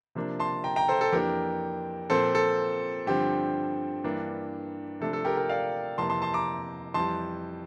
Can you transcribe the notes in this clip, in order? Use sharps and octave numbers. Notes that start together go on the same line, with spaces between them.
C3 F3 A#3 D4
A5 C6
G5 A#5
G5 A#5
A4 C5
A4
F2 E3 A#3 D4 G4 A#4
A#2 F3 C4 A4 C5
A4
G2 D3 F3 C4 G4
G2 E3 A#3 D4
C3 F3 A3 D4 A4
A4
G4 A#4
G4 A#4
D5 F5
F2 C3 E3 A#3 A5 C6
A5 C6
A5 C6
A#5 D6
F2 E3 G3 A5 C6